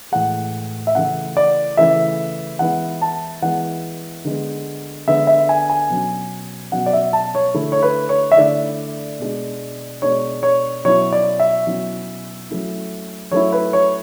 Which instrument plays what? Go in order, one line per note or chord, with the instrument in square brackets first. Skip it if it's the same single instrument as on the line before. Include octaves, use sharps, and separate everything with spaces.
[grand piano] A2 E3 G#3 F#5
E5
C#3 E3 A3 E4 F#5
D5
C#3 E3 A3 E4 E5
E3 G#3 B3 E4 F#5
A5
E3 G#3 B3 E4 F#5
D3 G#3 B3
D3 G#3 B3 E5
E5
G#5
G#5
B2 F#3 C#4
B2 F#3 C#4 F#5
D5
E5
A5
C#5
D3 A3 E4
C#5
B4
C#5
E5
D3 A3 E4 D5
B2 G#3 D4
B2 G#3 D4 C#5
C#5
B2 F#3 C#4 E4 C#5
D5
E5
B2 F#3 C#4 E4
F#3 A3 C#4 E4
F#3 A3 C#4 E4 C#5
B4
C#5